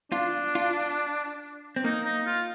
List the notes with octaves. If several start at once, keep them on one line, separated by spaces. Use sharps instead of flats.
D4 F4
F4
C4
A#3 D#4
D#4
F4